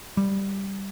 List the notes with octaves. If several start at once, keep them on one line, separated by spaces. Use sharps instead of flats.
G3